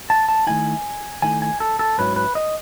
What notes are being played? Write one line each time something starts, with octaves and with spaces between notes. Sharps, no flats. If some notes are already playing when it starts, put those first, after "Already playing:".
A5
A5
D#3 A3 E4 G#5
D#3 A3 E4 G#5
G#5
A4
A4
G#2 F#3 C#4 E4 B4
B4
D#5